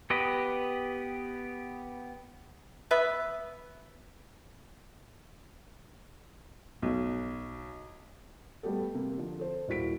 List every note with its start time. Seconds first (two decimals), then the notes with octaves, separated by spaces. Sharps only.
0.10 B3 G4 B4 D#5
2.91 B3 B4 E5
6.82 B1
8.63 G3 A3 B3 G4 A4
8.94 C3 A#3
9.18 D3 F3
9.40 A4 C5
9.68 D#1 A#2 E4 F#4 B6 D7